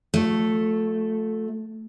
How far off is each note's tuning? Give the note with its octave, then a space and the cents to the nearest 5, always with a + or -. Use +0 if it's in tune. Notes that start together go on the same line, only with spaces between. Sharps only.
F3 +40 A3 +0 C#5 +0